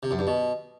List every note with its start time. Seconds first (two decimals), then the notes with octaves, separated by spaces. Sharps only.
0.03 C3
0.11 F#2
0.19 G2
0.27 B2